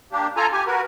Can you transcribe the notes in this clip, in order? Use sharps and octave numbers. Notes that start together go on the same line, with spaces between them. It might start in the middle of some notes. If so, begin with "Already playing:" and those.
A#3 D4 G4
F4 A4 G#5 A#5
G4 G#5
F#4 A#4 B4